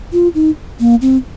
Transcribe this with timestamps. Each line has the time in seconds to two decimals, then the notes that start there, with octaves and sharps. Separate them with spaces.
0.13 F4
0.35 D#4
0.80 A#3
1.01 C4